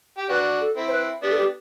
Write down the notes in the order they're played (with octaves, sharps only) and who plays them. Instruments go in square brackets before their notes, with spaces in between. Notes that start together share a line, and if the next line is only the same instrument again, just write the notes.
[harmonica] G4
[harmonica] D4 F#4 [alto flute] B4
[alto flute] A4
[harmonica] C4 E4
[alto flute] C5
B4
[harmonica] B3 D4 [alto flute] G4
[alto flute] A4
G4